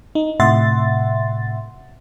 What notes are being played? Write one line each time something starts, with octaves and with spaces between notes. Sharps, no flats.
D#4
A2 C3 E5 F#5 C6 A6